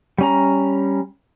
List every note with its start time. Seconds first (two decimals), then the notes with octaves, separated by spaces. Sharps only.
0.18 G3 C#4 A#5